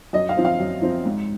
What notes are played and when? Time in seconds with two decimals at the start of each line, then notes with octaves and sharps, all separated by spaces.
0.13 F#2 D#5
0.29 F5
0.37 F3 C4
0.45 F5
0.60 F#2
0.82 F3 C4
1.06 G#2